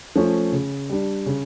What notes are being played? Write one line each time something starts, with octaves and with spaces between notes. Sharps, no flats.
F3 A3 C#4
C#3
G3 D4
C#3